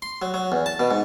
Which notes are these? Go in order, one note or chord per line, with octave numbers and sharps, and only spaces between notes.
C6
F#3
F#3
E2
A5
B2
G#2